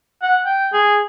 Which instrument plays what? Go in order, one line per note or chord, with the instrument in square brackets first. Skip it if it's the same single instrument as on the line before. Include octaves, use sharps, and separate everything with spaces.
[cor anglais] F#5
G5
G#4